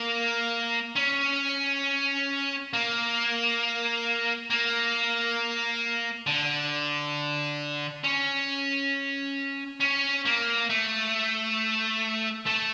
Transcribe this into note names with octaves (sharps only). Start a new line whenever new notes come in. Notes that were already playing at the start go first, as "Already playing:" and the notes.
Already playing: A#3
C#4
A#3
A#3
D3
C#4
C#4
A#3
A3
A3